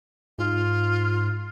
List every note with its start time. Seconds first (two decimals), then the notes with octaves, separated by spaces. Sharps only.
0.38 G#2 F4